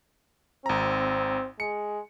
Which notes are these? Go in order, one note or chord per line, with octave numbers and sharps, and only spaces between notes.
G#1 C4 A#5
G#3 C#7